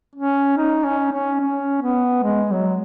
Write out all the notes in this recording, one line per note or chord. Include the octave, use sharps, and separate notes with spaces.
C#4
D#4
C#4
C#4
C#4
B3
G#3
F#3